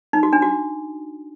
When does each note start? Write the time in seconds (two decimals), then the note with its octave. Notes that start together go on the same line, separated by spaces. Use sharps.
0.13 D#4
0.23 F#4
0.33 D4
0.42 F#4